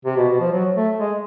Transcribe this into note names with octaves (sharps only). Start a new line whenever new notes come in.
C3
B2
B2
F3
F#3
A3
G#3